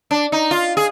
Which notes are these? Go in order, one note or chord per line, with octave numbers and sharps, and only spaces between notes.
D4
D#4
F4
G#4